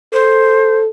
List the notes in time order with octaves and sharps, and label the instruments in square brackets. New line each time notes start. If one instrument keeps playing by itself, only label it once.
[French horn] A4 [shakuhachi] C5